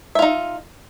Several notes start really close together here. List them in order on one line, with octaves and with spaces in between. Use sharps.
E5 F4 D#4